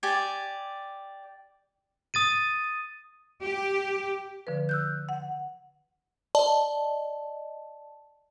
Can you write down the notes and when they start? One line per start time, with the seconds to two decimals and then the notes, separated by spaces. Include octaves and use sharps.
0.03 G4 D5 G#5
2.14 D#6 A6 D#7
3.41 G4
4.47 D3 F3 B4
4.69 E6 F#6 G6
5.09 F#5
6.35 D5 D#5 A5